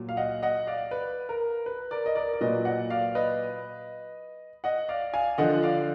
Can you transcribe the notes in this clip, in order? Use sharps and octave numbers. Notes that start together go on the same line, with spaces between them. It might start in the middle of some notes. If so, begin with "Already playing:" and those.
Already playing: A#2 F#3
F5
D#5 F#5
D#5 F#5
D5 F5
B4
A#4
B4
A#4 D5
D#5
A#4 D5
D5
A#2 F#3 B4 D#5
D#5 F#5
D5 F5
B4 D#5
D#5 F#5
D5 F5
F5 G#5
D3 F3 D#5 F#5
D5 F5